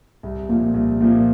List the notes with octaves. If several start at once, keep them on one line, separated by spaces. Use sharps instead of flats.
C2
A#2 F3 A#3
C2
A#2 F3 A#3